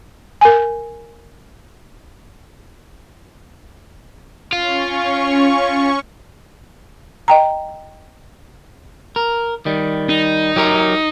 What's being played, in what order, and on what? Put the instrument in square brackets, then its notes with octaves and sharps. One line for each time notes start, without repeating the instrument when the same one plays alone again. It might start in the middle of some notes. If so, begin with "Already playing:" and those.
[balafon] A#4 G#5
[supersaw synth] C#4 C#6 [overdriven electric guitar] F4
[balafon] D#5 G5 A#5
[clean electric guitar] A#4
D#3 G3
[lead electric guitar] D#4
[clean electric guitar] F#3 G4 A#4